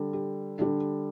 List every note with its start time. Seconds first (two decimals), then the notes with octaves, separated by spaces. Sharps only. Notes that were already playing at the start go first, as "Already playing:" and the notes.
Already playing: D3 G3
0.13 G4
0.59 D3 G3